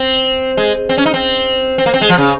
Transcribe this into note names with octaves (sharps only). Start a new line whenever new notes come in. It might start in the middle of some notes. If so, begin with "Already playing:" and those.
Already playing: C4
G#3
C4
C#4
D#4
C4
C4
A#3
C4
G#3
F3
C#3